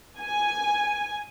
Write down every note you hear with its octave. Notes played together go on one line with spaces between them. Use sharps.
G#5